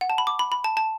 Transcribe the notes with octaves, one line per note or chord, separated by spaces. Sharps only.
F#5
A5
B5
D6
B5
B5
A5
A5